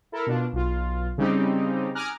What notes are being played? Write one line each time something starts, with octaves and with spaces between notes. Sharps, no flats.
E4 A4 A#4
B2 D4 F4
B1 F4
C#3 G3 C4 D#4 G4
G#5 A#5 D6 D#6 F6 F#6